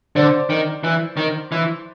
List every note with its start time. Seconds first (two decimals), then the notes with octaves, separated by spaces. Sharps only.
0.15 D3 C5 D5
0.50 D#3
0.84 E3
1.17 D#3
1.52 E3